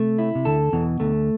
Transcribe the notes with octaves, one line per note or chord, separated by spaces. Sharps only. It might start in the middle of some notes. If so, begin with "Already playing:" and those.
Already playing: C3 A3 C4
E4
C3
D2 D3 A4
E2 B2 E3
D2 D3 A3